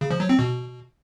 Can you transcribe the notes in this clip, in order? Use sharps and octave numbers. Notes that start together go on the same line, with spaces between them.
C#3
F3
F#3
C4
B2